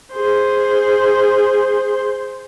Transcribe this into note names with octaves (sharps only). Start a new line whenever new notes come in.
G#4 C5